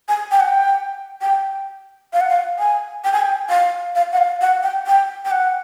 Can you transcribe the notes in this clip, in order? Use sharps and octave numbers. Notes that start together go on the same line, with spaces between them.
G#5
G5
F#5
G5
G5
F5
F#5
F5
G#5
G5
G#5
G5
F5
F5
F#5
F5
F#5
G5
G5
G5
F#5